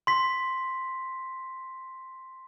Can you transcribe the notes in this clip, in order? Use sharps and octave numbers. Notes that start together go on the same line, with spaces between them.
C6 B6